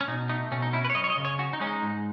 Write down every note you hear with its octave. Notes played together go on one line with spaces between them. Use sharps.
C#4
B2 D#4
A3 D#4
B2 C#4
D#4
C#4 E4
B4
C#5
F#2 D#5
C#5
D#5
C#3
C#5
C#4 F#4
D#4
G#3 C#4
D#4
G#2